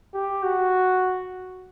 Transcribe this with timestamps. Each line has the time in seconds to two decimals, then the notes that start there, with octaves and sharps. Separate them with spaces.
0.14 G4
0.43 F#4